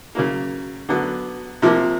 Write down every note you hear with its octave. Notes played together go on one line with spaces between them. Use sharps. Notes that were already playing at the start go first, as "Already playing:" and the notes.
C#3 F#3 A#3
D3 F#3 B3
C3 F3 A#3